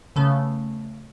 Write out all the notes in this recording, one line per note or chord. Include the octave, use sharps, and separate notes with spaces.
C#3 A3 B3